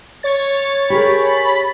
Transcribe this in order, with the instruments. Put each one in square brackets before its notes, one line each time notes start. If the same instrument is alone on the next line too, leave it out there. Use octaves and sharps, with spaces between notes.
[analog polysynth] C#5 A6
[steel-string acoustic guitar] G4 G#4 A#4 [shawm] B5